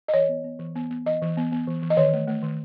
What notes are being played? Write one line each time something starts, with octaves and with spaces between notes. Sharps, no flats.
D#5
E3 C#5
B3
B3
E3
B3
B3
E3 D#5
E3
B3
B3
E3
E3
D#5
D#3 C#5
A3
A3
D#3